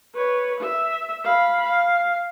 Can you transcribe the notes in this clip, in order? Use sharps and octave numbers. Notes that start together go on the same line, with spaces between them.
B4 C#5
E5
F5 B5
F5